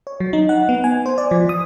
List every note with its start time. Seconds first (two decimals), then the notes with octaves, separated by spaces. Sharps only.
0.07 C#5
0.20 F#3
0.33 D#4
0.49 F#5
0.69 B3
0.84 G#5
1.06 C5
1.18 D5
1.31 F3
1.49 D#6